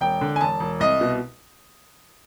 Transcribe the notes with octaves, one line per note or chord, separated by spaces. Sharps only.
E1 G5
D3
G#5
E1 A5
E1
C2 D#5
B2